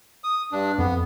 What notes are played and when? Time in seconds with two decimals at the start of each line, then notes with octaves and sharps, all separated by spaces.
0.24 D#6
0.52 G2 D4
0.78 F2 B3